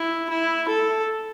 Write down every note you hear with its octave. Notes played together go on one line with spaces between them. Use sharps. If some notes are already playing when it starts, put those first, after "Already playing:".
Already playing: E4
E4
A4